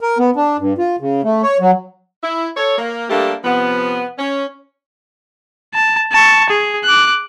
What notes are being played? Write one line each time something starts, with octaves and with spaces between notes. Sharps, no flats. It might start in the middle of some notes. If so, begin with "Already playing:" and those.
A#4
B3
D4
G2
F4
C#3
A3
C#5
F#3
E4
A4 C#5
A#3
G3 A3 A#3 D4 G4
C3 F3 B3
C#4
A5
A5 C#6
G#4
D6 F#6